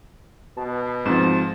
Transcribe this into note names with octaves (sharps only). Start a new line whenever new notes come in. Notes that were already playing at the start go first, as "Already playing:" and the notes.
B2 A5
G#2 F3 C4 A6 E7